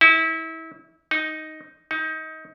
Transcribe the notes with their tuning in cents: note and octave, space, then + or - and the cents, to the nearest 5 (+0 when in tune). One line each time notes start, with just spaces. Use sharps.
E4 -30
D#4 +5
D#4 +25